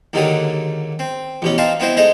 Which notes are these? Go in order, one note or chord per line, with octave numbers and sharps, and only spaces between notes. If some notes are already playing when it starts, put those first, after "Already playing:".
D#2 G#2 D3 D#3 F#3 D#6
C4
A1 B2 C#4
C4 D#4 F5 A5 A#5 C6
B3 C4 E4 C5 D#5
G#3 A3 D#4 C5 D#5